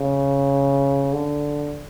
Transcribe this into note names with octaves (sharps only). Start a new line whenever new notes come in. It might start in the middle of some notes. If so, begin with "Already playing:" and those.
Already playing: C#3
D3